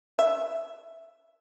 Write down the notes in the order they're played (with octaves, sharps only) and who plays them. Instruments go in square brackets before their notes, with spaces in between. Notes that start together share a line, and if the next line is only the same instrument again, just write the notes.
[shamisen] E5